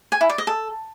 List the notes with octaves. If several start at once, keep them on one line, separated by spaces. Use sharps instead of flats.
G#5
E4
D5
D#5
A4